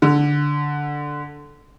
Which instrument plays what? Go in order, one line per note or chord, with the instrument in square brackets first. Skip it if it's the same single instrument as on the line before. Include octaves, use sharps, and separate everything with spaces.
[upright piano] D3